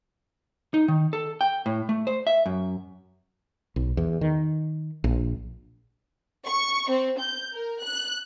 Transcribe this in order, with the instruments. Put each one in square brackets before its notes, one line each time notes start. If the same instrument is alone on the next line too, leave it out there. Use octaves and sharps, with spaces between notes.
[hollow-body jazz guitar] D#4
D#3
A4
G5
A2
A3
C5
E5
F#2
[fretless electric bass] B1
E2
D#3
A#1
[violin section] C#6
C4
G6
A#4
F#6